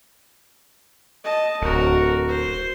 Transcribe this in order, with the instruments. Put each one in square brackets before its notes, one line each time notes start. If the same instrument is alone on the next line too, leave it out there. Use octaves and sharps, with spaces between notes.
[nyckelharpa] D#5 A5
[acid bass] D1 [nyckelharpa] F#4 A#4
[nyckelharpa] C5